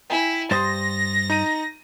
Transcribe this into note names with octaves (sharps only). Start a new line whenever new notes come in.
E4 G5 G#5
G2 C5 C6 D#6 A6 A#6
D#4 A#5 D#7